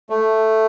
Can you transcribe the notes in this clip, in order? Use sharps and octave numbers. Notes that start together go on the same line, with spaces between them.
A3